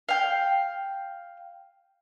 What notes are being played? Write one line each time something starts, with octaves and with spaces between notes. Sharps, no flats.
F5 G5